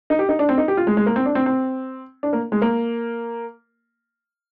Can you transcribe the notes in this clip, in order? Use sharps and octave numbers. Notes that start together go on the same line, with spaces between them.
D#4
G4
D#4
D4
C4
D#4
G4
F4
G#3
G#3
A#3
C4
D4
C4
C4
D4
A#3
G#3
A#3